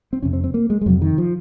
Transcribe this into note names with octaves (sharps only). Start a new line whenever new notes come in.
C4
F2 C3 C#4
C4
C4
A#3
G#3
G#3
F2 C3 F#3
D#3
F3